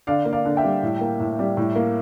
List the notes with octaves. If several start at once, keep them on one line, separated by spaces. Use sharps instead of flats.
D3 D5 F5
A#3
D5 F5
D3
E5 G5
G3
A2
A#3
A2
G3
A2
A#3